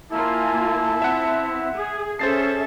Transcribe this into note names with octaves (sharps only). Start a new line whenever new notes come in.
A#3 E4 F4 G#5 A5
C4 E5 F#5
G#4
C#4 G#4 A4 C5 E5 A5 A6 C7